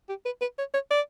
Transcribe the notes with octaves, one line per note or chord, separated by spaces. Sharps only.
G4
B4
B4
C#5
C#5
D5